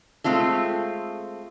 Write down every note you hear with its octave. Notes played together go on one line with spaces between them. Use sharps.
G#3 A3 C4 F4 A4